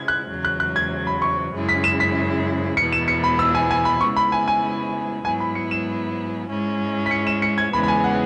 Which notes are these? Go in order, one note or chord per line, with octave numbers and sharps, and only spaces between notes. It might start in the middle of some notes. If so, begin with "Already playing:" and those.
Already playing: C#3 G#3 E4 G#6
F#6
E2 C#3 F#3
F#6
F#6
G#6
B5
C#6
F#2 C#3 G#3 E4
B6
E7
B6
E2 B2 B3 E4 C#7
E7
C#7
B5
E6
G#5
G#5
B5
C#3 G#3 B3 E4 C#6
B5
G#5
G#5
G#2 F#3 B3 E4 G#5
B5
C#7
E7
G#2 G#3 C#4 E4
B6
C#7
E7
C#7
G#6
E2 C#3 E3 G#3 B3 B5
B5
G#5
F#5